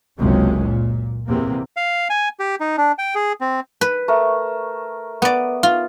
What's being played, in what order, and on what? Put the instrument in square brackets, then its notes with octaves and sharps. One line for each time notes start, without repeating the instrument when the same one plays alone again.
[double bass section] F#1 C#2 C3 G#3 C#4
A#2
E2 C3 A#3
[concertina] F5
G#5
G4
D#4
D4
G5
G#4
C4
[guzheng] B4
[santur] A3 A#4
[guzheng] B3 D5
F4